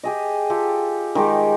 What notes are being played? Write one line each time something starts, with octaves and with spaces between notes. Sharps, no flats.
G4 G#4 D#5
F4 G4 A4
D#3 G#3 D#4 G4